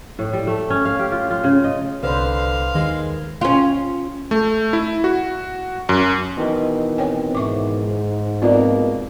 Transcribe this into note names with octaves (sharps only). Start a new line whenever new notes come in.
A2
G3
A3
C#4
F5
G4
F4
F4
C#3
D#5
C2 D3 B4 C5 F5
D#2 D#3 G#3
C#4 F4
A3
E4
F#4
F#2
B2 D#3 E3
C4 C#5 G5 G#5
G#2 E5 C#6 D6
B2 A#3 C4 F4 D5